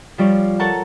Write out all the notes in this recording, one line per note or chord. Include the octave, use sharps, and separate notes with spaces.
F3 G3 C#5 D5
A4 A#4 C#5 F#5 A5